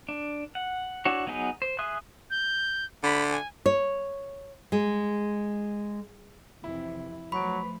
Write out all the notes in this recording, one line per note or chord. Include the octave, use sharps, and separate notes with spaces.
D4
F#5
D4 E4 F#4 C#5
F#3 B3 D#4 G#4 B4
C5
G#4 E5 C6 D#6 F#6
G6
D3 B5
G#5
C#5
G#3
F2 C3 E3 E4
F3 F#3 A3 B4 B5 C#6 D7